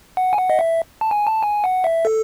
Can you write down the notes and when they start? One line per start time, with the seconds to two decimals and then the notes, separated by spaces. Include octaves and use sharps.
0.17 F#5
0.33 G#5
0.38 F#5
0.50 D#5
0.59 E5
1.01 A5
1.11 G#5
1.27 A5
1.43 G#5
1.64 F#5
1.84 E5
2.05 A4